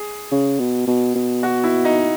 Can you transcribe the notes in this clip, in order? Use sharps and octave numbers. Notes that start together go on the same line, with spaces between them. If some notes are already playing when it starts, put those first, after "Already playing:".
Already playing: G#4
C#3
B2
B2
B2
F#4
E4
D#4